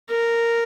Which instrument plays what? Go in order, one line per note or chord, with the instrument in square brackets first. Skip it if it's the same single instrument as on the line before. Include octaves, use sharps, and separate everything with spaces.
[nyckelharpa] A#4